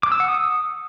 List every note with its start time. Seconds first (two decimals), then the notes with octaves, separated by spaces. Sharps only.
0.03 D6
0.12 E6
0.20 F#5
0.28 D#6